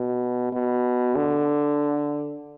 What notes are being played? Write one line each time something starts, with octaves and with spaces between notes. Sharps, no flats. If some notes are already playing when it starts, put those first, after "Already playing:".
Already playing: B2
B2
D3